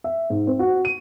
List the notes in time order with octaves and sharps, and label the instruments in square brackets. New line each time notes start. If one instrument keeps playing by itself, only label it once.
[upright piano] E5
G#2
C4
F#4
D#7